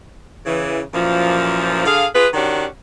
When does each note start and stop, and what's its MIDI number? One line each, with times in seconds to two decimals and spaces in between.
0.45 0.81 49
0.45 0.81 52
0.94 1.84 42
0.94 1.84 46
0.94 1.84 52
0.94 1.84 53
1.86 2.06 50
1.86 2.06 68
1.86 2.06 77
2.15 2.28 65
2.15 2.28 68
2.15 2.28 71
2.34 2.66 51
2.34 2.66 61
2.34 2.66 62
2.34 2.66 66
2.34 2.66 67